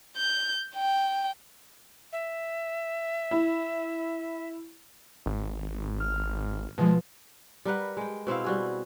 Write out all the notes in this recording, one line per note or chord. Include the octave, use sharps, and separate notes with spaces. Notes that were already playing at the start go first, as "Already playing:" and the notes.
G6
G5
E5
E4
G#1
F6
B2 F3 G#3
G3 A#4 B4 F#5
G#3 G5
B2 C4 E4 F5
G3 F#4 G#4